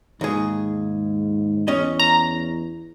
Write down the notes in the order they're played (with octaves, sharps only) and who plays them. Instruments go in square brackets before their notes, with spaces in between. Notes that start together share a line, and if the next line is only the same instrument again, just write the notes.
[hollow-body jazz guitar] D#2 G#4 [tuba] G#2
[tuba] E2 [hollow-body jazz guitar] C#4 D#5
[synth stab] A#5